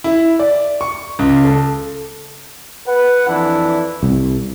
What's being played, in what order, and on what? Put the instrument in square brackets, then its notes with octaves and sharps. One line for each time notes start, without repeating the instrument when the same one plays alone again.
[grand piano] E4
D5
C#6
C#2
A4
[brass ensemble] B4 F#5
F2 E3 D4 E4
[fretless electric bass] C2